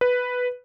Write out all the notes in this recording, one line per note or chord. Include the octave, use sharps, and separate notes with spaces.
B4